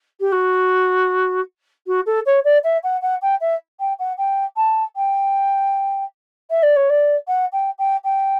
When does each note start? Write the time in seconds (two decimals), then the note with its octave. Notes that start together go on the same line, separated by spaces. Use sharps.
0.20 G4
0.32 F#4
1.86 F#4
2.06 A4
2.26 C#5
2.44 D5
2.64 E5
2.83 F#5
3.02 F#5
3.21 G5
3.41 E5
3.79 G5
3.99 F#5
4.17 G5
4.56 A5
4.96 G5
6.50 E5
6.62 D5
6.76 C#5
6.89 D5
7.27 F#5
7.52 G5
7.78 G5
8.04 G5